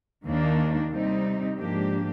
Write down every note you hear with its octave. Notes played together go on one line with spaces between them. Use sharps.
D#2 D#3 A#3 D4
C3 G3 C4 D#4
G#2 F3 A#3 D4 G4